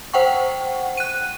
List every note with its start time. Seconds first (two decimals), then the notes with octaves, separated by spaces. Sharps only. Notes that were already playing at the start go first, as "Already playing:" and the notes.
0.14 C5 F#5 G5 C#6
0.97 F#6 D#7